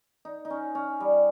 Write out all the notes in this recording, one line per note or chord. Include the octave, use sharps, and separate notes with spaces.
D#4
D#4
C#4
C#4
G3